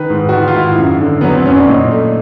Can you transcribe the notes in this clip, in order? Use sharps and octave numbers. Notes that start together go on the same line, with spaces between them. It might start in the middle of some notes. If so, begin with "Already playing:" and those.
Already playing: D#3 B4
G#2
F#4
D#3 F4
F4
G#2 E4
F#2
D3
F#3 B3
C4
F#2 C#4
D4
A#2 D#4
A3